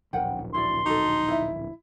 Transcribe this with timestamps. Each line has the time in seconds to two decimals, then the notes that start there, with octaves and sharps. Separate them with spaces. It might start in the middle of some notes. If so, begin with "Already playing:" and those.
0.13 D1 A#1 A#4 F#5 G5
0.54 E4 F#4 D5 C6
0.86 D#4 F#4 A4
1.28 E4 E5